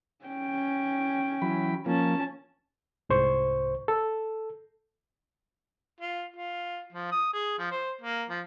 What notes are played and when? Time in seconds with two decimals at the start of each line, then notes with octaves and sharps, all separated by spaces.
0.25 C#4 G5
1.42 E3 F#3 B5
1.86 F3 A#3 C#4 A5
3.09 C2 G#2 C5 C#6
3.88 A4
6.00 F4
6.36 F4
6.92 F3
7.12 D#6
7.33 G#4
7.59 F3
7.71 C5
8.01 A#3
8.29 F3